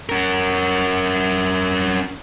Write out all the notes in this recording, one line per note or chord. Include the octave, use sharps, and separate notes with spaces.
C#4 A#4